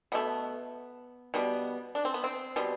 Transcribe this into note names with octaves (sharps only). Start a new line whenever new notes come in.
B2 A3 B3
B2 G3 B3
D4
C4
B3
C4
B2 G3 B3